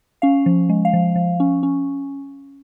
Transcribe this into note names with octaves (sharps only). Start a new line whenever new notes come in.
C#4 F5
F3
G#3
F5
F3
F3
C#4
C#4